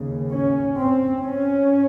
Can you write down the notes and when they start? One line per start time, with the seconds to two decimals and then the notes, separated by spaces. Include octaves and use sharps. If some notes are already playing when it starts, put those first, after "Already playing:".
Already playing: D#2 C#3
0.32 C#4
0.77 C4
1.22 C#4